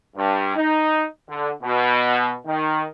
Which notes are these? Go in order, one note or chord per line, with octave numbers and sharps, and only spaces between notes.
G2
D#4
D3
B2
D#3